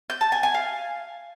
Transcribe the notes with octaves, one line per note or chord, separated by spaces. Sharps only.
G6
A5
G#5
G#5
F5